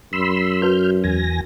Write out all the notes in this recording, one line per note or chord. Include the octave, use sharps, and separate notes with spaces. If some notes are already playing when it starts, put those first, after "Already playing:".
F#2 B5 C6 E6
F#4 B4 F6 G6
E2 G#5 A#6